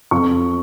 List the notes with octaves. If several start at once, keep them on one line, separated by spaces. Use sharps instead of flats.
F2 C#6